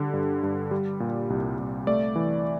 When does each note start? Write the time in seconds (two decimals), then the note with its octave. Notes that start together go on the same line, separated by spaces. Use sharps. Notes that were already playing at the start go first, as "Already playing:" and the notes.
Already playing: D3 G3
0.13 G2
0.43 G2
0.71 G3
1.00 A#2
1.30 C2
1.58 C2
1.87 A3 D5
2.16 E3